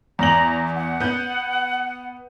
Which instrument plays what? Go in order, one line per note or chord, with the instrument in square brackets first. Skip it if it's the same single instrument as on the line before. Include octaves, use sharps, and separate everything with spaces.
[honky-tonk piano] E2 F#7 [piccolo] A#5
[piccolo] F#5
[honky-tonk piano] B3 G6